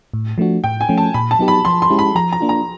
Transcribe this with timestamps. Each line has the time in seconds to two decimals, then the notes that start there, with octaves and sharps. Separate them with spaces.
0.14 A2
0.38 F3 A3 D4 F#4
0.64 A2 G5
0.81 G#5
0.89 F3 A3 C#4
0.98 A5
1.14 A#2 B5
1.31 A5
1.39 F#3 B3 D#4 G4
1.48 B5
1.65 F3 C6
1.82 C6
1.90 G#3 C#4 E4 G4
1.99 B5
2.15 F3 A#5
2.32 A#5
2.41 A#3 D4 F4
2.49 A#5